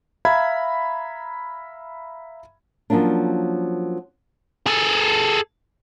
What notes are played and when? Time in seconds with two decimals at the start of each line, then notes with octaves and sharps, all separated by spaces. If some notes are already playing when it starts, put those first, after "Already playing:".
0.25 E5 F5 A#5 B5 G#6
2.90 F3 F#3 A#3 C#4 D4
4.66 G#4 A4